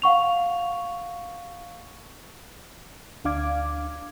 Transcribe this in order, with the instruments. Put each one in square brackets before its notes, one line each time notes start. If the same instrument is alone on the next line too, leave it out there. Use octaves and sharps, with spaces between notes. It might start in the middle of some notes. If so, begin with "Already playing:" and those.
[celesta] F5 F#5 C#6 F7
[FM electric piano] D2 D4 F5 D6 G#6